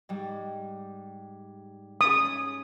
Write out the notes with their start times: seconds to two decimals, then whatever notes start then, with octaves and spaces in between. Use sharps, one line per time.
0.09 G#2 G3
2.01 C#4 G#4 D#6